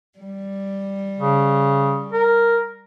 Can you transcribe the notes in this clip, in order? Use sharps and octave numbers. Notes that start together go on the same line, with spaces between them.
G3
C#3
A#4